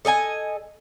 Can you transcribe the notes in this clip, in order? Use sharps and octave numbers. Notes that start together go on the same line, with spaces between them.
A4 D#5 G5 G#5